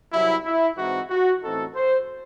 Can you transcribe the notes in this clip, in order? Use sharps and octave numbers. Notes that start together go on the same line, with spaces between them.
C2 C3 F#3 E4
E4
G#2 E3 C4 D#4 F#4
F#4
A1 A2 E3 C4 D#4 A4
C5